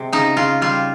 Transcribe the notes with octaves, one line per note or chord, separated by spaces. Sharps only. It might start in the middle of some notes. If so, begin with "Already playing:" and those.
Already playing: C3 G#3
C#3 D#4
C#3 F4
G3 F4